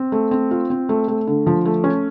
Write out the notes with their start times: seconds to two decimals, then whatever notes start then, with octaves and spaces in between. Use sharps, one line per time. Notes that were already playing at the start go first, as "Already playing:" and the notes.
Already playing: C4
0.12 A3
0.31 C4
0.51 F4
0.70 C4
0.89 A3
1.08 A3
1.27 D3
1.47 F3
1.65 A3
1.84 C#4